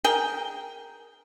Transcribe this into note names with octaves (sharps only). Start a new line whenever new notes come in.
G#4 A#4 G5